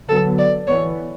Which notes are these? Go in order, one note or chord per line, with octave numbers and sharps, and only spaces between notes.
D3 F#3 B3 A4
D5
E3 B3 C#5